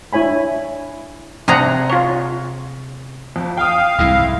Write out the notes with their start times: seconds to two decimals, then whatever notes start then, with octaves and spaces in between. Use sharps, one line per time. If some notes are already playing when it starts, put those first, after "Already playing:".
0.13 D4 E4 C#5 G#5 B5
1.48 C3 D4 G#4 F#5 A#5
1.90 F4 C#5
3.36 F2
3.57 F5 G5 D#6
3.99 C2 F2 G#2 E4